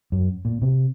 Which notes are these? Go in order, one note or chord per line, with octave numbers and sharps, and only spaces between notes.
F#2
A#2
C3